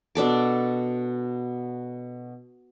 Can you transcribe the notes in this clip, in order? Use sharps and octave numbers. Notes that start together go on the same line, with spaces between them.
B2 D4 A4 D6